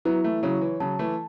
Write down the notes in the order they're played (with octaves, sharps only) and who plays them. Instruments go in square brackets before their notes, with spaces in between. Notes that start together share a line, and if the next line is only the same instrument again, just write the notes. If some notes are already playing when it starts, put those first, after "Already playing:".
[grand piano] F#3 B3 [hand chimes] E4
[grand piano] E3 A3
[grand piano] C#3 F#3 [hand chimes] C#5
[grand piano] E3
[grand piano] C#3 F#3 [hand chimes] A5
[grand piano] E3 A3